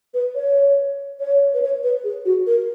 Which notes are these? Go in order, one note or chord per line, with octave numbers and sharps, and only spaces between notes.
B4
C#5
C#5
B4
C#5
B4
G#4
F#4
A#4